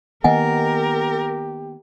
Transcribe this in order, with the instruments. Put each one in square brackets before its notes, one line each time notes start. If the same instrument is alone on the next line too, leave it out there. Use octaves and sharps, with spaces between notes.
[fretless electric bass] D#3 A#3 B3 [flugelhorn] G4 [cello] A#4 [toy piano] D#5 F#5 G#5